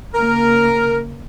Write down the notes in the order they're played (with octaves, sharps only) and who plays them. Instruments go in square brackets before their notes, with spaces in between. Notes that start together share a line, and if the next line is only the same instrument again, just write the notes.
[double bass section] C#3 A#3 [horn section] A#4